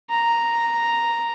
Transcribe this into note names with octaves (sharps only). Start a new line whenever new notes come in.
A#5